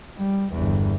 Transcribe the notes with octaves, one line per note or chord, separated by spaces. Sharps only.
G3
G1 E2